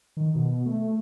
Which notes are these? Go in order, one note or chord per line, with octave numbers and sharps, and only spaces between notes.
D#3
B2
A3